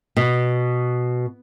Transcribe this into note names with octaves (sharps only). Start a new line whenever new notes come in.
B2